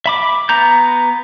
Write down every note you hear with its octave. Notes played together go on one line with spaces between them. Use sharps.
E5 B5 D6
B3 A#5 G6